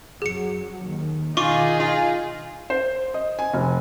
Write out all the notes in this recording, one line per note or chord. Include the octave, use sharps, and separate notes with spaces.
F#2 F#3 G#4 C#7
D#2 D#3
B2 D#3 D#4 F4 G#4 C#6 D6
F4
C5
D#5
G#5
F1